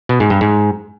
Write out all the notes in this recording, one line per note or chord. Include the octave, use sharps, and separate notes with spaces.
B2
G#2
G2
G#2